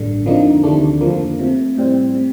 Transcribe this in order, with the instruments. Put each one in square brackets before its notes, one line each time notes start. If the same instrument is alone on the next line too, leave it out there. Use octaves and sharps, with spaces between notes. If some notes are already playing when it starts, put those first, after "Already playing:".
Already playing: [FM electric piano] A1 G2 D3
F2 D3 F3 A#3 D#4
D2 C3 D#3 A3 D4
F2 D3 F3 A#3
C3 F3 A3
A2 G3 C4
C3